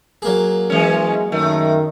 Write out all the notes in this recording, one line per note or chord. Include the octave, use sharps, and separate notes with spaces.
F#3 A#3 G#4
E3 G#3 C#4
F#2 D#3 A3